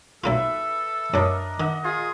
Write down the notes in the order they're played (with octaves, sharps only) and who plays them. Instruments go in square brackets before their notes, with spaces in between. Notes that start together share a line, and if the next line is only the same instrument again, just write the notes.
[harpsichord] B1 A#3 F4 [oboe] A4 [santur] B4 E5
[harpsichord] F#2 F#3 [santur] D4 A#4 D#5
[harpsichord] D#3 [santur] D#5 F#5
[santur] F4 [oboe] G#4